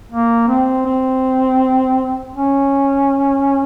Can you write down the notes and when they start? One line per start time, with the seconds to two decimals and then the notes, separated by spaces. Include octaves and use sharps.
0.11 A#3
0.48 C4
0.86 C4
2.36 C#4